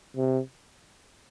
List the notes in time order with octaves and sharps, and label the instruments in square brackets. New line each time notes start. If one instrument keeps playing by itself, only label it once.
[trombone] C3